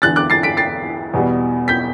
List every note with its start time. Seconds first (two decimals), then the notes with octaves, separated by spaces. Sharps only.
0.02 E1 E2 D3 F#6 A6
0.16 D6 F#6
0.30 A6 C7
0.43 B6 D7
0.57 A6 C7
1.13 E2 B2 G3 B3
1.68 G6 B6